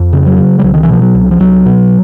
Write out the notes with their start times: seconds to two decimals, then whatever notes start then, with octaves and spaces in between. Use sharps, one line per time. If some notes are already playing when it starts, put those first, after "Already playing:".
Already playing: F2
0.13 C#3
0.26 F#3
0.39 C#3
0.59 G3
0.64 C2 F#3
0.74 D#3
0.83 E3
0.89 B2 F3
1.02 F#3
1.15 C2
1.31 F3
1.40 C2 F#3
1.66 B2